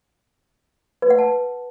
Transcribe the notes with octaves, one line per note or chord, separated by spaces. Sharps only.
B4
F#5
A5